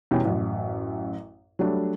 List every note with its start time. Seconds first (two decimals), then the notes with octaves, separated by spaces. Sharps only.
0.11 E2 B2 E3 G3 C#4 G5
0.25 A1 F#2
1.59 F#3 G3 A3 D4